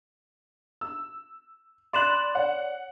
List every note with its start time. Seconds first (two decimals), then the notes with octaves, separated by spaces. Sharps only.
0.81 E6
1.93 D5 B5 C6 F#6 E7 F#7
2.35 C#5 D5 F#5